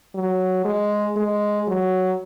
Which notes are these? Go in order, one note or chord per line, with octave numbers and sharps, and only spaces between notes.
F#3
G#3
G#3
F#3